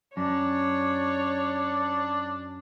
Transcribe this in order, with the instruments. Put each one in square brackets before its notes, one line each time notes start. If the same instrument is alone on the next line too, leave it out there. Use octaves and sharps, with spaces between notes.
[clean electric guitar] F#2 [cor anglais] D4 [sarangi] C#5